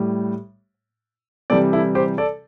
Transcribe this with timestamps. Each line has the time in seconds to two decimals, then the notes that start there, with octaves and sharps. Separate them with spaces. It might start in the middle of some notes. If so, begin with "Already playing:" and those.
Already playing: A2 G3
1.50 C3 E3 G3 A4 D5
1.72 E4 A4
1.95 G4 C5
2.18 A4 D5